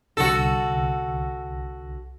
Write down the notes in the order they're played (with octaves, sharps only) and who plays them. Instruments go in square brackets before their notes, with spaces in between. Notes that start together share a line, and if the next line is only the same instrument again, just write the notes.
[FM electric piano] C2 D3 A#6 [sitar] F#4 A4